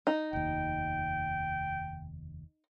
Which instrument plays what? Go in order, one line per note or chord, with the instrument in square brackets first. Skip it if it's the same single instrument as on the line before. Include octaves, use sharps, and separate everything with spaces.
[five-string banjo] D#4
[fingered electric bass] F1 D#2 [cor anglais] G5